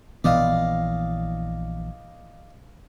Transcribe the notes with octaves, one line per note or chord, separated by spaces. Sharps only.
A#1 E3 B3 D5 D#5 F5